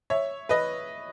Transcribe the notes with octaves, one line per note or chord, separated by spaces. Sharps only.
C#5 E5
B4 D#5